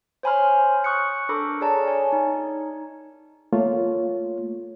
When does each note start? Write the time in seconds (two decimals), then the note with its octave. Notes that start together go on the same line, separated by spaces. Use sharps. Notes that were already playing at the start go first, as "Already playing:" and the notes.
0.23 C5 C#5 G#5 B5 C6 F6
0.84 C#6 D#6 F#6 G6 C#7
1.29 D4 A4 A#4 B5 D6
1.61 G#4 A#4 C#5 D5 A5 A#5
1.87 C#5 G#5
2.12 D#4
3.53 A3 A#3 F4 C#5